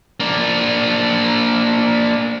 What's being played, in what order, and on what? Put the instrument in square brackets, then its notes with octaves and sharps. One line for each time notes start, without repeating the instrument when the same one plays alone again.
[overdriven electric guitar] A#3 D4